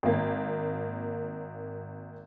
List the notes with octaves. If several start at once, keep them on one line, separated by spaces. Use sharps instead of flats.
G#1 A#3